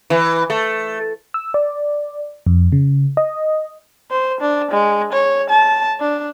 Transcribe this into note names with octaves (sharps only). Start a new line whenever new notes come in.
E3
A3
E6
D5
F2
C#3
D#5
C5
D4
G#3
C#5
A5
D4